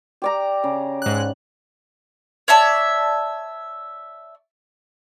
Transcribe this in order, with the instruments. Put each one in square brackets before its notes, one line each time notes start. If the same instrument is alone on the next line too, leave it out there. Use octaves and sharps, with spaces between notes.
[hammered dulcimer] G4 D5 A#5
C#3
[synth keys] G#2 F#6
[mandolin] C#5 D5 E5 A5